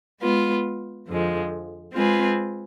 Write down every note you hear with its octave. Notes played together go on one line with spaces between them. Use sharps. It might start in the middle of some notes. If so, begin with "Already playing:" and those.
G#3 B3 F4
F2 D3 F3 G#3
G#3 C4 F4 G#4 B4